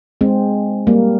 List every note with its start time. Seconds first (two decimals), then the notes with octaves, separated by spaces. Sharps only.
0.21 G#3 C4
0.87 G3 A#3